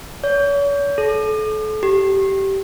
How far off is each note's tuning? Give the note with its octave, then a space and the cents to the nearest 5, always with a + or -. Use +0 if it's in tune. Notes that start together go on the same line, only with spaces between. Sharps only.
C#5 +40
A4 -35
G4 -15